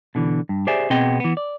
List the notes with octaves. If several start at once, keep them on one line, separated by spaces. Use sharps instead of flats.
B2 D3 E3
G2
G4 G#4 C5 D5 E5 G#5
B2 B3 C4 G#4 D#5 G5
E3 B3
D5